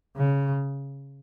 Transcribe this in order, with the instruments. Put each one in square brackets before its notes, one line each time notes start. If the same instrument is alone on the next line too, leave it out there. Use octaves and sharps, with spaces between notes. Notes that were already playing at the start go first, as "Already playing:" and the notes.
[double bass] C#3